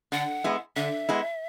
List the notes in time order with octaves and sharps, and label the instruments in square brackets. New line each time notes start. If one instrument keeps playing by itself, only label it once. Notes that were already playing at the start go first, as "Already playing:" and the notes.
[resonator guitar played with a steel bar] D3 [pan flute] F#5
[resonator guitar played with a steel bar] G#3 B3 E4
[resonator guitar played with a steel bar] D3 [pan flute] E5
[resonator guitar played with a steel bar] G#3 B3 E4